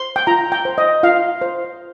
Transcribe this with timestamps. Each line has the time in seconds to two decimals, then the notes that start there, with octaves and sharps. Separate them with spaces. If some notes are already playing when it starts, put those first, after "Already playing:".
Already playing: C5 C6
0.16 G5
0.27 F4 A#5
0.52 G5
0.65 C5
0.78 D#5
1.03 F4 F5
1.41 C5